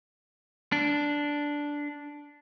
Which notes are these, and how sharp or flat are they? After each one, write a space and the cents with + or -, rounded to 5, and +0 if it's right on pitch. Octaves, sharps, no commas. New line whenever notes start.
D4 -5